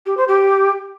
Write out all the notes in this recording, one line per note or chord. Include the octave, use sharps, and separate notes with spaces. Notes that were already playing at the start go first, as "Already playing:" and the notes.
G4
C5
G4